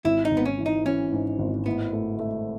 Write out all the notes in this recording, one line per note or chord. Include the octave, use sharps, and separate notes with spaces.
G#1 E4
D#4
G#1
B3
C#4
E3
D#4
E3 C#4
G#2
G#1
A2 B3
A3
A3